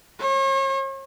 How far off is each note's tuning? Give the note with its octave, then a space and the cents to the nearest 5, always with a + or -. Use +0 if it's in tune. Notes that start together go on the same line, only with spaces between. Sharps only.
C#5 -40